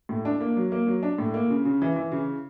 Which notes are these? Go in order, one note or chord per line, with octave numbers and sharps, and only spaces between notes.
A2
D4
A#3
F#3
A#3
F#3
D4
A2
A#3
C#3
C#3
E3
E3
C#3